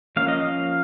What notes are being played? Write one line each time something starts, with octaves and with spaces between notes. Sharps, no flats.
F3 A#3 C#4 F5
D#5
F5